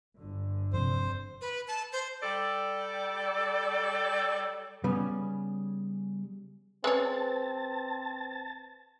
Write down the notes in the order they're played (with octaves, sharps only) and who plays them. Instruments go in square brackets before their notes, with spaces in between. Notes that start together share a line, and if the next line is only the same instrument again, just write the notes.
[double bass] G1 D3
[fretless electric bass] F2 C3 [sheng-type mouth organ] C5
[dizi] B4
A5
C5
[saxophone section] G3 A4 D5
[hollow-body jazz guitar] C#3 G3 B3 C#4
[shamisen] G#3 C#4 C#5 [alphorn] C4 [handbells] B4 [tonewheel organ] A5